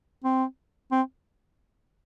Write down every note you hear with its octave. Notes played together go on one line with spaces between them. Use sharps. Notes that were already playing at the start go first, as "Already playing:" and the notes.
C4
C4